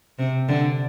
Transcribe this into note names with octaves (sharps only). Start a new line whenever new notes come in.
C3
D3